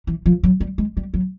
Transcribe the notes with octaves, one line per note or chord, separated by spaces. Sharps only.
E3
F3
F#3
G3
G#3
G3
F#3